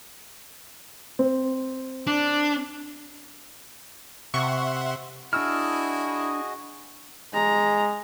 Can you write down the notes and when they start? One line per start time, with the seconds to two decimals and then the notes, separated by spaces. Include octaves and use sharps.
1.19 C4
2.07 D4
4.34 C3 E5 F#5 C6 C#6
5.33 D4 E4 F#4 G#4 D#5 E6 F6
7.34 G#3 A#5